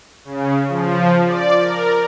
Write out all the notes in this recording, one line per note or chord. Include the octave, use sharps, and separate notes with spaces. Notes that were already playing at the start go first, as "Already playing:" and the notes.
C#3
F3
D5
A#4